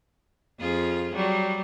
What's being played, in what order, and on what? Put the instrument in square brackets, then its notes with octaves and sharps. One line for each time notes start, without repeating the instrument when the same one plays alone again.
[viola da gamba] F2 F4 G#4
F#3 G3